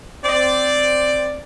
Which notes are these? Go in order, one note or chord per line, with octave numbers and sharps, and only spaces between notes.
C4 D5